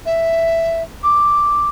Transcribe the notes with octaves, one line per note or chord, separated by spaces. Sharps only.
E5
D6